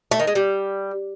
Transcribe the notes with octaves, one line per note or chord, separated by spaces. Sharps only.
A3
D#3
G#3
G3